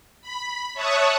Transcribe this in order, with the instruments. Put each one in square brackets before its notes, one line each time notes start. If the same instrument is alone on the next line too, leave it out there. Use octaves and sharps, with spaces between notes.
[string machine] B5
C#5 E5 A5 C#6 D#6 F#6